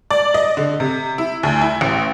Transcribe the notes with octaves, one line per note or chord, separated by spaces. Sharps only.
D5
D#5
D3
C3
E4
D2
E4
A1